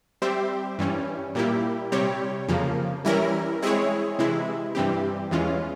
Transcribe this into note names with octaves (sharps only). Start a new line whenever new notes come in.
G3 C4 G4 C5 E5
G2 E3 G3 C#4
A#2 G3 A#3 E4 G4
C3 G3 C4 G4 C#5
F2 C#3 F3 A#3
E3 G3 C#4 E4 A#4
G#3 C4 E4 G#4 C#5
C3 E3 G#3 E4
G2 E3 G3 C4 G4
E2 E3 G#3 C#4 F4